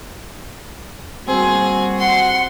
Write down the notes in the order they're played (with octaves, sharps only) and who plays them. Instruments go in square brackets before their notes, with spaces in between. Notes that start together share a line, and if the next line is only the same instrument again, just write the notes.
[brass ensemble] G3 A#3 F#4 [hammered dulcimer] C4 [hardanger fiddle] G#4
[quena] F#5 [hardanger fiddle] C6